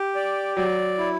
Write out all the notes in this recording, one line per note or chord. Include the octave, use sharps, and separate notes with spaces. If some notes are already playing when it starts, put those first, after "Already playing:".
Already playing: G4
D5
F#3 D5
E4